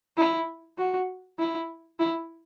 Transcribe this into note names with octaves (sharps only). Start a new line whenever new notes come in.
E4
F#4
E4
E4